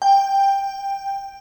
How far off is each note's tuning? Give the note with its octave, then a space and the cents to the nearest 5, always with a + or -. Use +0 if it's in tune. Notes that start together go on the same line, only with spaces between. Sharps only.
G5 +10